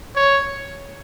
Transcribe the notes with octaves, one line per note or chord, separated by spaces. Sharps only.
C#5